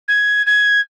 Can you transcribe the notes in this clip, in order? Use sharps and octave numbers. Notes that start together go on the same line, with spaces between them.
G#6
G#6